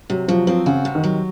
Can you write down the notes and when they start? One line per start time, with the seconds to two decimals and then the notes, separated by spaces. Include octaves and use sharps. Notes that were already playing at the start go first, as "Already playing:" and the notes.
0.10 C3 F#3
0.28 F3 F#3
0.47 F3 C4
0.66 C#3 F#4
0.85 C3
0.95 D#3
1.04 F#3